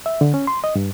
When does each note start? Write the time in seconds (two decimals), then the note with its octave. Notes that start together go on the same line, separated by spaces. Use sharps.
0.06 E5
0.21 D3
0.34 C#4
0.47 C6
0.64 D#5
0.76 G2